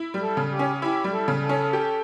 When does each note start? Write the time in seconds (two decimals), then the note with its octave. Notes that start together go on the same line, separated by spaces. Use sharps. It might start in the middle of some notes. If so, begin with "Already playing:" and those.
Already playing: E4
0.14 G3
0.21 A4
0.37 C#3
0.51 G4
0.59 C#4
0.82 E4 G4
1.04 G3
1.12 A4
1.28 C#3
1.42 A4
1.49 C#4
1.73 G4